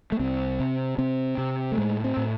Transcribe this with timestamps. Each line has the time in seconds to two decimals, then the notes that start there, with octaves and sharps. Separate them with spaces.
0.12 A3
0.19 C2 C4
0.60 C3
0.98 C3 C4
1.38 C3
1.72 A3
1.77 A2 G#3
2.04 C4
2.17 A2